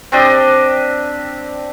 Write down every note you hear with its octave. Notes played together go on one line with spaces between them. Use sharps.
C4 D4 G4 D#5